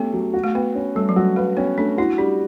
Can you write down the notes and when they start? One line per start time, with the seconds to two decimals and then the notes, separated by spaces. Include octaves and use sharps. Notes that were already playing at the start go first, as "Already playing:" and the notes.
Already playing: A3 B3 C#4 G4
0.13 F#3
0.34 F#4
0.44 A3
0.55 B3 B4
0.75 C#4
0.95 G3 A3
1.09 F#3
1.16 G3 F#4
1.36 A3 B4
1.57 B3 C#4
1.78 A3 D4
1.98 E4 F#4
2.18 G3 D4